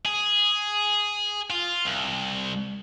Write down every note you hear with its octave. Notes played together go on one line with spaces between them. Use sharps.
G#4
F4
C2